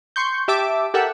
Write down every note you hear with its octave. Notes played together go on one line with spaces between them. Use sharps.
C6 C#6 G6
G4 E5 A5 D6
G4 A4 A#4 E5 F#5